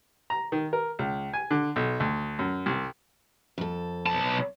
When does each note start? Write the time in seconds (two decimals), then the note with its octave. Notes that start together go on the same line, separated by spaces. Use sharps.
0.30 A#5
0.52 D#3
0.73 A#4
0.99 C#2
1.33 G#5
1.51 D3
1.76 B1
2.00 D2
2.39 F#2
2.66 C2
3.58 F2 A4
4.06 B1 A5